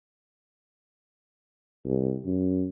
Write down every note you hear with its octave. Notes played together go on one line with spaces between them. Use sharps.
C2
F#2